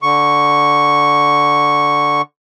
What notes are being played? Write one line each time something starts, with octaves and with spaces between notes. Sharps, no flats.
D3 C#6